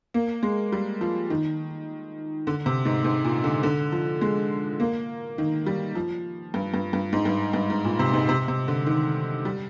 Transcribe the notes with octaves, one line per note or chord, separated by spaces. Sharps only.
A#3
G#3
G3
F3
D#3
D3
C3
G#2
G#2
A#2
D3
D3
F3
G#3
A#3
D#3
G3
F3
G2
G2
G2
G#2
G2
G2
G#2
A#2
C3
G#2
C3
C3
D3
D#3
G3